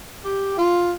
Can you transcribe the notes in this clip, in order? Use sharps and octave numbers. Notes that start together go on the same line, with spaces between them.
G4
F4